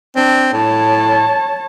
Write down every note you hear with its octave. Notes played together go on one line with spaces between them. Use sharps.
C4 D4
A2 C#5 A5